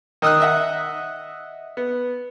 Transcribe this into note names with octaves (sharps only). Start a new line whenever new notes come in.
D#3 D#5 D#6 E6 F#6
D#5 E5 F#5
B3